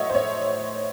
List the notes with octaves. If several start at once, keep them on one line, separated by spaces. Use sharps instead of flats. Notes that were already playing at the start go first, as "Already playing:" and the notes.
Already playing: A2 F#3 A3 C#5 D#5 E5 F#5
C5
C#5